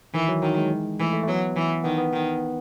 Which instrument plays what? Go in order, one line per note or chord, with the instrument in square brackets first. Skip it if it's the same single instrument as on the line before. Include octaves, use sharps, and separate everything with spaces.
[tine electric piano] D#3 [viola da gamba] E3
[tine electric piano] F#3
[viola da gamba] D#3 [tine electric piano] F#3
[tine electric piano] G#3
[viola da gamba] E3 [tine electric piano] A3
[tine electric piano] A3
A3
[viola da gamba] F#3 [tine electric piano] B3
[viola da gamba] E3
[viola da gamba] D#3 [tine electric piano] B3
[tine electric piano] B3
[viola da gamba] D#3